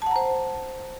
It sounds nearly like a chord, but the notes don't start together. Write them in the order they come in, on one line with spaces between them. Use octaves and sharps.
A5 F#5 A#5 C5